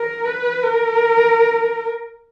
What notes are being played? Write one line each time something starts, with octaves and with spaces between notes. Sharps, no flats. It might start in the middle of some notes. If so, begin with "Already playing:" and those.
Already playing: A#4
B4
A#4